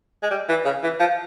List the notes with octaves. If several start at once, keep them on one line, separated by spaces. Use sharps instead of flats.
G#3
G3
E3
C#3
E3
F3